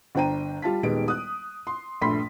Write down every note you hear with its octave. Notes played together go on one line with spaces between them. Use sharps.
G1 D4 C5 G5 A#5 D#7
G3 F4 A5 B6
D#1 D#3 G3 G#3 B3 D7
D#6 F#6
C6
A#1 G2 A3 B5 C6 B6